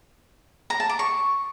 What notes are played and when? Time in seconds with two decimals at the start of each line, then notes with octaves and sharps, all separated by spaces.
0.70 A#5
0.80 A5
0.89 D6
0.99 C#6